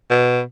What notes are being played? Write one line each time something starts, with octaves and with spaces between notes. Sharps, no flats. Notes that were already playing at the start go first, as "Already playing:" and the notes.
B2